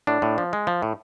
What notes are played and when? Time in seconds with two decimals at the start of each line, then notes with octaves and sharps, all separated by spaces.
0.07 A2 D4
0.22 A2
0.38 F3
0.53 G#3
0.67 F3
0.82 A2